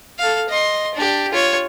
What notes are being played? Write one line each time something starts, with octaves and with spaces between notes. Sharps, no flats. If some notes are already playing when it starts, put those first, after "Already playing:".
A4 F5
D#5 C6
D4 G4
F4 C#5